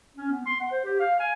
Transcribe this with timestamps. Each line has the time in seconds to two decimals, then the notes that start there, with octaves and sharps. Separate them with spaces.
0.17 C#4
0.30 B3
0.46 C6
0.60 F#5
0.71 C5
0.85 G4
0.99 F5
1.20 G#5